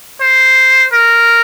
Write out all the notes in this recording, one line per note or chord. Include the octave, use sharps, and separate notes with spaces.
C5
A#4